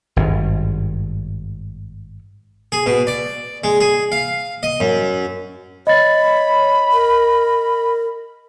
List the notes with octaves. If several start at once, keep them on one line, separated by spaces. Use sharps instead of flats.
G#1 G2
G#4
B2
D5
G#3
G#4
F5
D#5
F#2
C#5 D#5 B5 A6
A#4